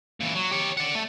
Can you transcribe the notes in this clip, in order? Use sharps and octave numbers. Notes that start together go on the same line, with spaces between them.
A#2 E3
F#3
G4 C#5
D5 F#5
A3